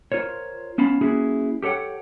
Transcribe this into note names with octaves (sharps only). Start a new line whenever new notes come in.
F4 A#4 C5 C#5
B3 C#4 F5 A5 B5
A#3 C#4 E4 F#4 G#4
G4 A4 C#5 F#5 G5